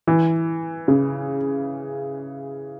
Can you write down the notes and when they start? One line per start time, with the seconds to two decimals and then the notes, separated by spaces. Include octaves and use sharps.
0.07 E3
0.88 C#3